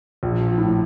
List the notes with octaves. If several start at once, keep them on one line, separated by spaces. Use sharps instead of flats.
A#1
F3
A2